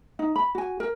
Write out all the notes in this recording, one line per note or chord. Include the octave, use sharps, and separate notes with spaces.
D#4
B5
F#4 G#5
A#4